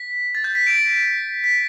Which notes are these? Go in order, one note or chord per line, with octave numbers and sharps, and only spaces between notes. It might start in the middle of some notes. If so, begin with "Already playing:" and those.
Already playing: B6
A6
G6
B6
D7
B6